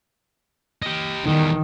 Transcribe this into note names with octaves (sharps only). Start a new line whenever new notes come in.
G4 D#5
E2 D#3 G3